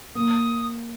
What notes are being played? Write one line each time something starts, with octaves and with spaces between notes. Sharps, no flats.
A#3 D#6